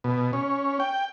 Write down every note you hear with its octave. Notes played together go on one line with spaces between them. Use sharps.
B2
C#4
G5